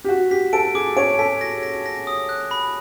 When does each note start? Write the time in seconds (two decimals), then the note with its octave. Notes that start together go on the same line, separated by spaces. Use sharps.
0.04 G4
0.09 F#4 B6
0.31 G4 B6
0.53 A4 D7
0.75 G#4 D6
0.97 C#5 D7
1.19 A4 B6
1.41 A#6
1.63 A#6
1.86 A#6
2.07 D#6
2.29 F#6
2.51 B5